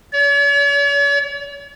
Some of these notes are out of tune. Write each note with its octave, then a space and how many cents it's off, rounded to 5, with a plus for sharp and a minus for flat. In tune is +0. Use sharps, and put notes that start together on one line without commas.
C#5 +45